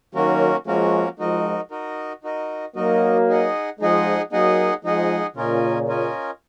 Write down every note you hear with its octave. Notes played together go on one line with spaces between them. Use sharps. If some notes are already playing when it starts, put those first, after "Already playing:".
D#3 F#3 A#3 C#4 F#4 A#4
F3 G#3 A#3 C#4 F#4 A#4
F3 G#3 D#4 F#4 A#4 D#5
D#4 F#4 A#4 D#5
D#4 F#4 A#4 D#5
F#3 A#3 D#4 F#4 A#4 D#5
D#4 G#4 D#5 F#5
F3 G#3 D#4 G#4 D#5 F#5
F#3 A#3 D#4 G#4 D#5 F#5
F3 G#3 D#4 G#4 D#5 F#5
A#2 C#3 C#4 F4 A#4 D#5 G#5
C#4 F4 A#4 D#5 G#5